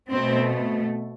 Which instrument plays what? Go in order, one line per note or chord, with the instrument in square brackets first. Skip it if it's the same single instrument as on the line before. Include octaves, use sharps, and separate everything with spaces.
[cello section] B2 A3 C4